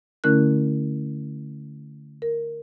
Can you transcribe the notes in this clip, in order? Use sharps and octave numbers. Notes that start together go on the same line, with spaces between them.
D3 A3 C#4 E4 A#4 F#6
A#4